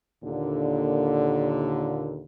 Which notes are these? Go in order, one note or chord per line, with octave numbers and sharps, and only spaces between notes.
D#2 A#2 D3